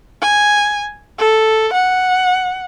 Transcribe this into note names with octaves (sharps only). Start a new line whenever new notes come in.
G#5
A4
F#5